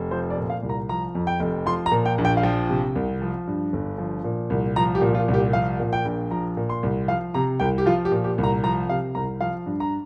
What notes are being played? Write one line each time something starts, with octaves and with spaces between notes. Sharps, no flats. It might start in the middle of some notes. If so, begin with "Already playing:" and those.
Already playing: F1
F3 C5
D5
A#2
F5
C2
A#5
F3 A#5
F2
G5
F1
F3 C6
A#5
A#2
G5
A#1
G5
F5
F3 G5
C3
C2
F3
G2
G1
F3
A#2
C2
F3 A#5
G4
A#2
F4
C2
G4
F3 F5
A#2
G5
A#1
F3 A#5
A#2
C6
C2
F3 F5
C3 A#5
C2 G5
G4
F3 F4
G4
A#2
G4
C2
A#5
F3 A#5
C3 F5
C2 A#5
F3 F5
G2
A#5